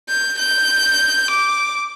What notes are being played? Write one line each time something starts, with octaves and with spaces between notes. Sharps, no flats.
G6
G6
D6